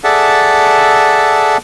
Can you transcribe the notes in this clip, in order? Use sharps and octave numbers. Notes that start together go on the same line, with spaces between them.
G#4 A4 D5 E5 F#5 A5